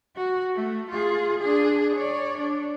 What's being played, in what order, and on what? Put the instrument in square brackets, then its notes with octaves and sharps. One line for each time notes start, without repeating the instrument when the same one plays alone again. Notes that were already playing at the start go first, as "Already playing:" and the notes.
[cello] F#4
A3
F4 G#4
D4 G#4
C#5 D5
D4